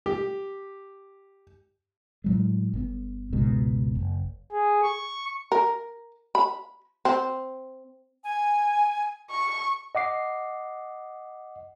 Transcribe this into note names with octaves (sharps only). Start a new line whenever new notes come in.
G4
A2 F#3 G#3
G1 C3 B3
G1 C#2 G#2 B2
F#1
G#4
C#6
A#4
B5
C4
G#5
C#6
D#5 F#5 D6 C7